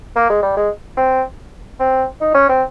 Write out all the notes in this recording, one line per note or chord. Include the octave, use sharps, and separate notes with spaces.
A#3
G#3
G3
G#3
C4
C4
D#4
C#4
C4